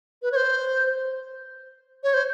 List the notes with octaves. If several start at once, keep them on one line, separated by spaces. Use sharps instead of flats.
B4
C#5
C5
C#5
C5